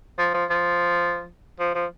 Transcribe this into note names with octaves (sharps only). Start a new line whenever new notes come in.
F3
F3
F3
F3
F3